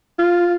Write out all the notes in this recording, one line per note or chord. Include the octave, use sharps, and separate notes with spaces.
F4